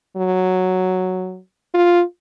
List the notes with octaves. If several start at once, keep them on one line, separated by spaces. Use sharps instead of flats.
F#3
F4